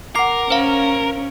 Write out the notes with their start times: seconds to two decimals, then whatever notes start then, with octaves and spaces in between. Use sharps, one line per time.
0.16 A#4 F#5 D6 C7
0.50 C#4 C5 F5 E7